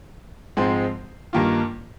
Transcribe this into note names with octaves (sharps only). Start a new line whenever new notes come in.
G#2 F3 G#3 C4
G2 D#3 A#3 F4